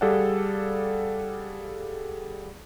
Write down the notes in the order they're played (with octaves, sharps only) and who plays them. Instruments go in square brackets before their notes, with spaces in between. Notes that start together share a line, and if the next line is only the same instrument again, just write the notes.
[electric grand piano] G3 G#4 A4 D5 F5 F#5